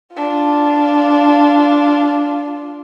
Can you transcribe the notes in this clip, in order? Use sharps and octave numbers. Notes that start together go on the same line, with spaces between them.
D4 F4